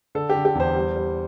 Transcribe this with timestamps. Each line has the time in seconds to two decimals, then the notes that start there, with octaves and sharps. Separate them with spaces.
0.15 D3 A4
0.30 G4
0.35 D3
0.45 G4
0.55 E2 C5
0.76 G3
0.96 G3